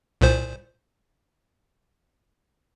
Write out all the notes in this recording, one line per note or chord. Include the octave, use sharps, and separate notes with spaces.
C2 A#2 C5